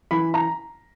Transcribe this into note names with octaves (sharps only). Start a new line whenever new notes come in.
E3 B5
A#5